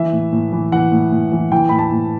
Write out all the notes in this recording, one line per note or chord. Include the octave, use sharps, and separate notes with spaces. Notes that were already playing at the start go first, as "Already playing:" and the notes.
Already playing: E3 E5
A2
A2
E3
E3 F#5
A2
A2
E3
E3 G5
A2 B5
A5
A2